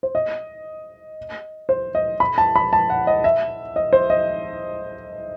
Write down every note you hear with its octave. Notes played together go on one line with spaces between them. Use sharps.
C5
D#5
C5
D#5
B5
A5
B5
A5
F#5
D#5
E5
D#5
C5
D#5